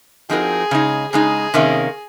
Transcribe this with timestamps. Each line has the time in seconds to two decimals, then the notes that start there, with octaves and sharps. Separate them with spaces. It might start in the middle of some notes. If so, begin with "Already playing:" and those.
0.29 F3 C4 D#4 F#4 G#4 A#4
0.71 C#3 G#3 D#4
1.12 C#3 G#3 D#4 G#4
1.54 C3 D#3 A#3 C#4